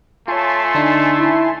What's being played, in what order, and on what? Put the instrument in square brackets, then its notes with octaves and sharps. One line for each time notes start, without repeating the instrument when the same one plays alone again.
[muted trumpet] A3 [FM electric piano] F4 C#5 [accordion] G#5 A5 C6
[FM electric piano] D3 D4 D#4
[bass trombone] E4